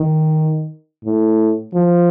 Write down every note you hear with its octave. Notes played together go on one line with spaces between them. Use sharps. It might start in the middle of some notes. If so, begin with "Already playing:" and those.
Already playing: D#3
A2
F3